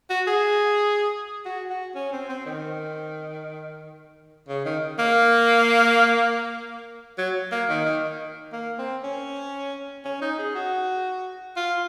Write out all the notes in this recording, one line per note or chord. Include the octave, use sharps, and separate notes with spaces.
F#4
G#4
F#4
F#4
C#4
C4
C4
D#3
C#3
D#3
A#3
F#3
A#3
D#3
D#3
A#3
C4
C#4
C#4
D#4
G#4
F#4
F4